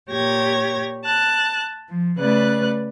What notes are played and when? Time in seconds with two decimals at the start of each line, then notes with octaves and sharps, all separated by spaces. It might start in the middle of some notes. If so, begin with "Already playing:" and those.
0.11 A#2 G4 C#5 G#6 A#6
1.05 A5 F#6
1.89 F3
2.19 C#3 A3 B4 D5 F#6